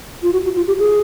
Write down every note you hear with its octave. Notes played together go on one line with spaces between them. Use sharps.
F4
F#4
F#4
F4
G4
G#4